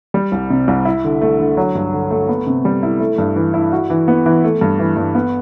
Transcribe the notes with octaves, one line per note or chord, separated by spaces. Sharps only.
G3
C2
C3
C2
E4
D3
A3
D3
F#3
G2
D3
A3
B3
C3
G3
E4
A3
G2
E3
E4
F#4
E3
B3
E3
A3
G2
E3
G2
B3